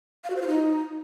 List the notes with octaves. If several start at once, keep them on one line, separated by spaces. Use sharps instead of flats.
F5
F#4
C5
F4
D#4